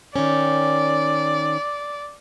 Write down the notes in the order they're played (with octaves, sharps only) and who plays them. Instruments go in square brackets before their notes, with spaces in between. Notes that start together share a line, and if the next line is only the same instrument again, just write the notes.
[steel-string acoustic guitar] D#3 C#4 [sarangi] D5